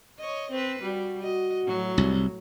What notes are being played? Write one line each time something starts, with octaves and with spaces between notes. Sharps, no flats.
C#5 D#5
C4 B4 C5
G3 F#4
F#4 D#5
A2 F#3
C2